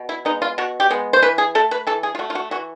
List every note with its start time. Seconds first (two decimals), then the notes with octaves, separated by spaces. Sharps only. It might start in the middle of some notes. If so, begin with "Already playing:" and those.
Already playing: B2
0.09 E4
0.25 G#3 B3 D#4
0.42 F4
0.58 B2 F#4
0.80 G4
0.91 G#3 B3
1.13 C5
1.22 E3 B4
1.38 G#4
1.55 A3 A4
1.71 B4
1.87 E3 A4
2.03 G#4
2.15 F4
2.19 A3 F#4
2.30 F4
2.35 F#4
2.51 E3 F#4